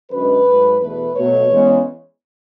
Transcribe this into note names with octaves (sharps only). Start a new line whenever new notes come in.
F#2 D3 G#3 B4
G#2 F#3 A3
E2 B2 A3 B4
B2 F#3 A3 C#5
E2 C#3 G#3